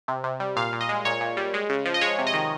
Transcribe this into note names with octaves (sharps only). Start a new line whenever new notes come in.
C3
C3
G3
A#2 F5
A#2
D#5
G#3
A#2 C#5
A#2
G3
G#3
C#3
F3
D#5
G#3 C#5
C3
D#5
D#3